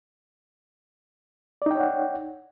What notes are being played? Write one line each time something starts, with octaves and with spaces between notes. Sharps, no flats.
D#4 C#5 D5 F#5 G5